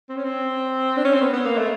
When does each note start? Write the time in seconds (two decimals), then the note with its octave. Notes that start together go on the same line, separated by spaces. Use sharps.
0.09 C4
0.17 C#4
0.24 C4
0.97 D4
1.05 C#4
1.13 C4
1.22 B3
1.33 B3
1.46 A#3
1.58 A3